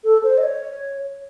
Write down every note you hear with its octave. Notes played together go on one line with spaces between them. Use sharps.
A4
C5
D#5
C#5